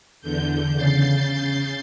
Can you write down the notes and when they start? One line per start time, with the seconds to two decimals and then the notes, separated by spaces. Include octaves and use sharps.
0.21 E2 D3 G6
0.74 C#3 G6 A6 C7